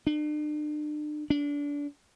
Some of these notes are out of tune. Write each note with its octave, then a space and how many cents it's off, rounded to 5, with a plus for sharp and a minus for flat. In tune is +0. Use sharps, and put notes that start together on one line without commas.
D4 +40
D4 -25